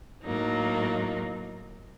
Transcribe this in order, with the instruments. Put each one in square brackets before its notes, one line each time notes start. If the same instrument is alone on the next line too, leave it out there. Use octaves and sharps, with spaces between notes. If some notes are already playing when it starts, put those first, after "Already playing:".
[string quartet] A2 F#3 A#3 D#4